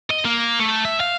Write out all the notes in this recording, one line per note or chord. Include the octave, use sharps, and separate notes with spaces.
D#5
A#3
A3
E5
F5